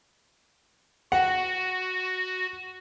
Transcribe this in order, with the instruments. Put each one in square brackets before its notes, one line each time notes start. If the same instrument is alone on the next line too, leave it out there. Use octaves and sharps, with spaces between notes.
[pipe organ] F#4 [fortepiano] F#5